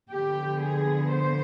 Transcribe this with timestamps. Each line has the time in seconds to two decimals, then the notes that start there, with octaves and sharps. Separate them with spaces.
0.11 D3 F3 B3 G4
0.63 G#4
1.13 C5